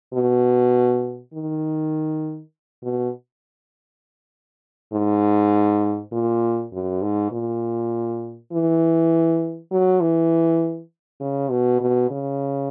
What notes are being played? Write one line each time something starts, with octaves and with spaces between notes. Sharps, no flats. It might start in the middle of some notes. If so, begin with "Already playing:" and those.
B2
D#3
B2
G#2
A#2
F#2
G#2
A#2
E3
F#3
E3
C#3
B2
B2
C#3